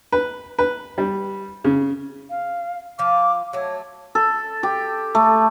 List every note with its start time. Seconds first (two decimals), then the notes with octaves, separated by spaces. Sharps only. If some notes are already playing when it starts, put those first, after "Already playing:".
0.12 B4
0.59 B4
0.98 G3
1.64 C#3
2.29 F5
2.99 F3 F5 D6
3.53 F#3 A3 C#5
4.15 A4
4.63 G4
5.15 A3